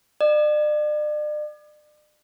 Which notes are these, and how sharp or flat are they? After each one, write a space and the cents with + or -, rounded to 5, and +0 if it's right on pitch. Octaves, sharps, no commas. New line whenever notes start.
D5 +40